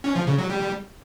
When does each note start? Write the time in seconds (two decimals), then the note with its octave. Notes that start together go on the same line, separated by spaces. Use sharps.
0.04 C#4
0.16 F3
0.27 C#3
0.38 F#3
0.50 G3